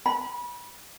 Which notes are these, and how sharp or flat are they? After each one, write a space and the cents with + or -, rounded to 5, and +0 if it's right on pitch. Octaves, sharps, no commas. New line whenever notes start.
B5 -30